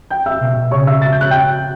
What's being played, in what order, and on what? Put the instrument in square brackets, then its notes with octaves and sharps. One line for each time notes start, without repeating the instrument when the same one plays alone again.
[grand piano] G5 G6
E5 E6
[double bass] B2
[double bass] C#3 [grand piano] C#5 C#6
[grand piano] E5 E6
A6
G6
F#6
G5 G6